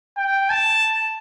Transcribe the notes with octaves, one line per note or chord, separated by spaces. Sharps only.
G5
A5